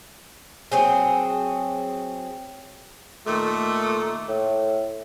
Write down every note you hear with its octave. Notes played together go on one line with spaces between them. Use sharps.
F#3 C4 G#4
A#2 D#3 A3
A2